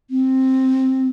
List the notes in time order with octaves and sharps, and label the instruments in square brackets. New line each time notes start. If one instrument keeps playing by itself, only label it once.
[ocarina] C4